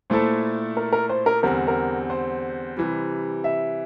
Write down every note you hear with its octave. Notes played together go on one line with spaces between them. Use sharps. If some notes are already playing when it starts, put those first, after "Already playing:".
A#2 A3 E4 A4 C5
A#4
A#4
C5
A#4
E2 D3 G3 C4 A#4
A#4
C5
C3 E3 G3
E5